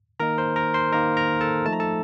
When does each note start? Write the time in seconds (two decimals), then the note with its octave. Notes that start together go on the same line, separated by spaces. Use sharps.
0.20 D#3 A#3 D#4 A#4 A#5
0.38 C5 C6
0.56 A#4 A#5
0.74 C5 C6
0.92 D#3 A#3 D#4 A#4 A#5
1.17 A#4 A#5
1.41 A4 A5
1.65 F3 A3 D#4 A5
1.73 A#5
1.80 A4 A5